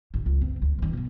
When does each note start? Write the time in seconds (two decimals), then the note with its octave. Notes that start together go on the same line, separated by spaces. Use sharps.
0.14 A1 D3
0.26 C#2
0.41 F#1 C4
0.62 D2
0.79 G2 D#3
0.93 B2 B3